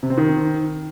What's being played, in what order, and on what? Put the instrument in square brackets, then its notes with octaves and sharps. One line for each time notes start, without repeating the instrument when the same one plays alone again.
[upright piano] C3
C4
D#3